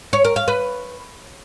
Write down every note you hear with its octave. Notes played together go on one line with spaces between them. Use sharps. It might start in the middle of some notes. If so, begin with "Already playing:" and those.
C#5
A#4
F5
B4